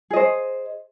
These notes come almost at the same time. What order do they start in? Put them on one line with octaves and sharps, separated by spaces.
G#4 D#5 C5